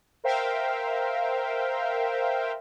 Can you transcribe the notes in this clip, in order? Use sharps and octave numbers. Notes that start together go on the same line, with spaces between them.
A#4 C5 E5 F5 G5